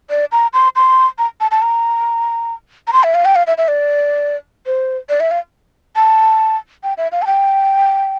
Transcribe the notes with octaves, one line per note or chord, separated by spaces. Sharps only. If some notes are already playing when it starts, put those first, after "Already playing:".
D5
A#5
C6
C6
A#5
A5
A5
A#5
A#5
C6
E5
F5
G5
F5
E5
E5
D5
C5
D5
E5
F5
A5
G5
E5
F5
A5
G5